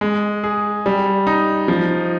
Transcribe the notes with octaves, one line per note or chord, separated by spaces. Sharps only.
G#3
G#4
G3
D#4
F3